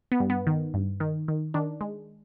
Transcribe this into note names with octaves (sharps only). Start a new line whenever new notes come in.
B3
G2
B3
D#3
G2
D#3
D#3
D#3 D4
G#3